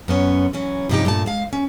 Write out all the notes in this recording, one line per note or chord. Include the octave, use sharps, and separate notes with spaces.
F#2 B3 C#4
E3 F#3 C#4
G2 C3 F3 C#4 D#4 G4
G2 A#2 A3 A5
G#3 F5
C#4